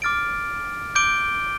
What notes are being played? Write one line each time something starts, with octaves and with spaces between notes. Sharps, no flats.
D6 F6 A6 D7
D6 G6 D7 G7